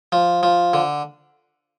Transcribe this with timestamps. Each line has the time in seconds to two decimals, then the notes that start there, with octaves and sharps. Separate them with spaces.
0.12 F3
0.43 F3
0.73 D3